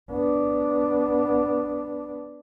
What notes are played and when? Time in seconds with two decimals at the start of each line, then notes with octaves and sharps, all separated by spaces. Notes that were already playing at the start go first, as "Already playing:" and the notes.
0.11 B3 D4